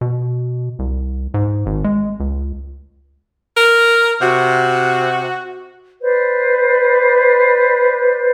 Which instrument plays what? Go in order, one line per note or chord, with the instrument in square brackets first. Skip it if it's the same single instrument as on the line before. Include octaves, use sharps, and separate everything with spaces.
[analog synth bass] B2
C2
G#2
G#1
G#3
C#2
[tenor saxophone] A#4
[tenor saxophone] C3 [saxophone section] F#4
[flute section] B4 C5 D5